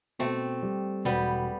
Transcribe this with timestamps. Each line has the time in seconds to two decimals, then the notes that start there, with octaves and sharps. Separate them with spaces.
0.19 B2 A3 C4
0.63 G3
1.05 E1 G3 B3